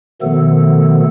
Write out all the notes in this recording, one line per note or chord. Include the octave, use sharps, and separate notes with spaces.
B2 D#3 F3 A3 B3 A4